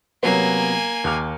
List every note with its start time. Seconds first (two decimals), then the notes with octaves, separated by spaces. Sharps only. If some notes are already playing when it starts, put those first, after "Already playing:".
0.23 C3 F#3 A#3 B3 G#5
1.04 D#2 D6 F6